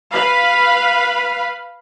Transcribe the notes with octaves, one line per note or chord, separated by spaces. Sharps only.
B4 F5 B5